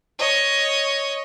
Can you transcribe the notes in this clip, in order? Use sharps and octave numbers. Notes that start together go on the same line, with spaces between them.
C#5 D#5